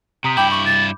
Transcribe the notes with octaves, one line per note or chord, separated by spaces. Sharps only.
C3 A#5 D#6 B6
G2 E4 G5 B5 D6 G6
C#6
A6